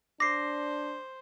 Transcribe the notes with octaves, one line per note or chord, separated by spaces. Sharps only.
D4 C5 D6 A#6 C7